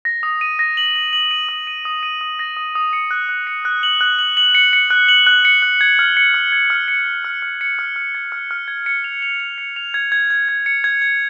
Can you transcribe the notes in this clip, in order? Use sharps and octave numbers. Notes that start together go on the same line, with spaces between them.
A#6
D#6
D#7
A#6
F#7
A#6
F#7
D#7
D#6
D#7
D#6
D#7
D#6
A#6
D#6
D#6
C#7
F#6
F#6
C#7
F#6
F#7
F#6
F#7
F#7
C#7
C#7
F#6
F#7
F#6
C#7
F#6
G#6
F6
C#7
F6
G#6
F6
C#7
C#7
F6
F6
C#7
F6
F6
G#6
F6
F6
G#6
C#7
F7
F7
F7
C#7
F7
G#6
G#6
G#6
G#6
C#7
G#6
G#6